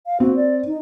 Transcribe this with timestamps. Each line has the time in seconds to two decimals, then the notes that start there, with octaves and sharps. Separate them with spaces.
0.06 F5
0.20 C4 F#4
0.36 D5
0.67 D#4